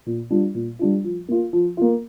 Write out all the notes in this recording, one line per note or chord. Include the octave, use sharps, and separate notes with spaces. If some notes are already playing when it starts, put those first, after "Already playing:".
A#2
G3 D4 F4
A#2
G3 D4 F4
F3
A#3 F4
F3
A#3 F4